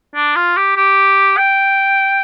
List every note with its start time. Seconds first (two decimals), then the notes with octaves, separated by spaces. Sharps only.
0.15 D4
0.36 F4
0.57 G4
0.77 G4
1.38 G5